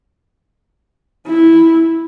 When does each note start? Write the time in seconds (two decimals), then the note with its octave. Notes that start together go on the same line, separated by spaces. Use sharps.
1.27 E4